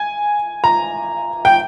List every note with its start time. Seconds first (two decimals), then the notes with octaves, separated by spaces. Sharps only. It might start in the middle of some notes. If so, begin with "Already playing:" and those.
Already playing: G#5
0.64 A#5
1.45 G5